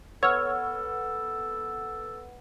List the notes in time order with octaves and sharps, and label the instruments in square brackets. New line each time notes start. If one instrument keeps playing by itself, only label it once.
[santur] B3 [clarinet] A4 [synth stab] C#5 [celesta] E6 F6